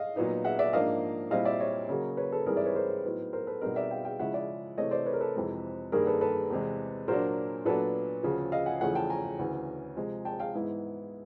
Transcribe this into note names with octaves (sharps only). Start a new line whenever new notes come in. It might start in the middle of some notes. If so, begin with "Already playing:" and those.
Already playing: D#5 F5
A#2 F#3 B3 D#4
E5 F#5
D5 E5
G#2 F3 A#3 D4 D#5 F5
A#2 G3 C4 E4 D#5 F5
D5 E5
C#5 D#5
C#3 F#3 A#3
B4 C#5
A4 B4
G#2 E3 G3 C4 G#4 A#4
D5 E5
B4 C#5
A#4 C5
A2 F#3 B3 D#4
A#4 C5
A4 B4
B2 G3 C4 D#4 A#4 C5
D5 E5
F5 G5
F5 G5
C#3 F3 G#3 C#4 E4 E5 F#5
D5 E5
C3 E3 A3 C#5 D#5
C5 D5
B4 C#5
A#4
A4 B4
F2 C3 E3 G#3
G2 D#3 G3 A#3 G#4 A#4
A4 B4
A4 B4
E2 C3 E3 G#3
A#2 F#3 A#3 D4 A#4 C5
A#2 F#3 B3 D4 A4 B4
D2 C#3 F3
D#5 F5
F#5 G#5
E2 C#3 F3 A3 F#5 G#5
G5 A5
G#5 A#5
D2 C#3 E3
C3 F3 G#3
G5 A5
F5 G5
G#2 E3 G#3 B3 E4